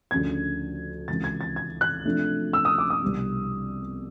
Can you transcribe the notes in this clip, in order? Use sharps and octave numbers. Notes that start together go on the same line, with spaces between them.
D2 C#3 F3 G#6
C#2 C3 E3 A6
G#6
A6
G#6
F#6
C3 F3 A3 D4
E6
D#6
D6
D#6
C2 B2 G3